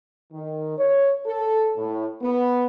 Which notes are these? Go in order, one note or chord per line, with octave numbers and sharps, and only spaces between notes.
D#3
C#5
A4
A2
B3